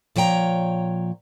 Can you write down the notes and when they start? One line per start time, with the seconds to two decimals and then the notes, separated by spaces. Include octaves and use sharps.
0.16 A#2 F3 C#5 G5 A#5